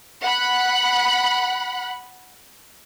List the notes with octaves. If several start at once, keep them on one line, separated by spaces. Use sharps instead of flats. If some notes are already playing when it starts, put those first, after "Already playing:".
F#5 B5 F#6